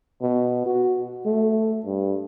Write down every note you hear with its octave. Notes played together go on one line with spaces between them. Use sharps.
B2
F#4
A3
G2